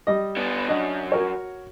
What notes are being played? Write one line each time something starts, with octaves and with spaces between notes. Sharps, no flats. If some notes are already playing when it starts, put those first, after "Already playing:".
G3 D#5
B3 D4
F#2 D4 D#5
F#4 A#4 C#5